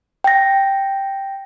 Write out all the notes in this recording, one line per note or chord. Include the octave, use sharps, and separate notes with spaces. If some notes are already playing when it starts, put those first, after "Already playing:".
G5 A#6